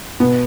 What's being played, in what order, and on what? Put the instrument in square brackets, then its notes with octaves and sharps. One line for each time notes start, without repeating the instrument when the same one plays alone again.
[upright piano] B2 B3